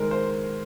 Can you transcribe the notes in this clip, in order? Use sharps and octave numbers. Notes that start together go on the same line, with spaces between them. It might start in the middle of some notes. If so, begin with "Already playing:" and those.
Already playing: D#3 G#3 A#4 C5
C5